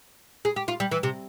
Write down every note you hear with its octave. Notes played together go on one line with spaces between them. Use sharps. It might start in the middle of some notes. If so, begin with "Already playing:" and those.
G#4
G4
F4
G3
E3
C3